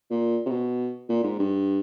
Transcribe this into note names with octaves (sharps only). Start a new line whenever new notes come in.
A#2
C3
B2
A#2
G#2
G2